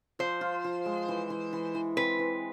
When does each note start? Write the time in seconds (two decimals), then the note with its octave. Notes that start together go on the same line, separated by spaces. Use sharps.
0.19 F3 C5
0.41 F4
0.64 F3
0.86 G#3
1.08 E3
1.30 E3
1.53 E3
1.75 E3
1.96 C4 B4
2.19 E3